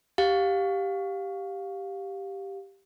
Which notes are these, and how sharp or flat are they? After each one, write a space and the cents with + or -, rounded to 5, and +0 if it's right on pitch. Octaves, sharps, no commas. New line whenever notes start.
G4 +0 F5 +20